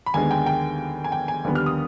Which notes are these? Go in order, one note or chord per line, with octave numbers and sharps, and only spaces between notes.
B5
D#2 D3 G#3 B3 G#5
G5
G5
G#5
G5
G#5
D#2 D3 G3 B3
F6
D#6